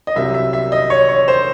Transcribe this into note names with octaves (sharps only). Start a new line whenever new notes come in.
D#5
C2 C3 F#3 E5
E5
E5
D#5
C#5
C#5
C5